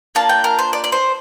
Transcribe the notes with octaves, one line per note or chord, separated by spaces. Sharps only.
A#3 D4 F4 A5
G5
A#4
C5
D5
D5
C5